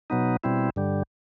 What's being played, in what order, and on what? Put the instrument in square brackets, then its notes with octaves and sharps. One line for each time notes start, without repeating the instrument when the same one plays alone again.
[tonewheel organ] B2 F#3 B3 D#4
B2 G3 C4 E4
G2 D3 G3